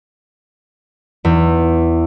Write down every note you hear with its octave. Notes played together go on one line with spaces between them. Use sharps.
E2